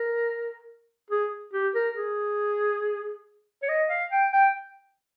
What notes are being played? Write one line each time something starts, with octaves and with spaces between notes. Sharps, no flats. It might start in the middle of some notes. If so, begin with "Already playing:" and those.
Already playing: A#4
G#4
G4
A#4
G#4
C#5
D#5
F5
G5
G5